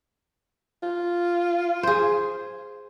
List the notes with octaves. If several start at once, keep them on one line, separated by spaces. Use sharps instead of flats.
F4
G#4 C5